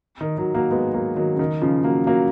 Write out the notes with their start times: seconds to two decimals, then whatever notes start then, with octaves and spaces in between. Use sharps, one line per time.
0.21 D#3
0.38 D#3 F#3
0.55 F#3 A#3
0.71 G#3 B3
0.94 F#3 A#3
1.17 D#3 F#3
1.35 C#3
1.39 D#3
1.62 C#3 F3
1.84 F#3 A#3
2.07 F#3 A#3